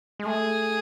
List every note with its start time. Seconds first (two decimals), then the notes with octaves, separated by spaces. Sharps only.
0.19 G#3
0.26 A3 G#4